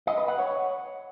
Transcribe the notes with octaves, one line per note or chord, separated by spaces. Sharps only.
D#5
B4
F#5
C#5